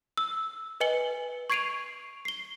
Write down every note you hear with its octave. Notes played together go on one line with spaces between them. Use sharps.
E6
B4 D#5 G#5 C#7 F#7 G7
C#6 G#6 C7 D7 D#7 F7
C7 G7